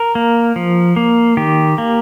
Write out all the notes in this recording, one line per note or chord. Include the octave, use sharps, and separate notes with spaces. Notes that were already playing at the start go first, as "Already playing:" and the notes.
Already playing: A#4
A#3
F3
A#3
D#3 G4
A#3